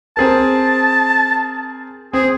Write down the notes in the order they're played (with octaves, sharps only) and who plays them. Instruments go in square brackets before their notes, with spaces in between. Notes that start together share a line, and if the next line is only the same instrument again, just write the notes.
[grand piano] C4 G#4 A#4 [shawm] A5
[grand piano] C4 [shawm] G#4